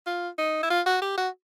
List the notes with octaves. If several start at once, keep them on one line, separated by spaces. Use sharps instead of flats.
F4
D#4
E4
F4
F#4
G4
F#4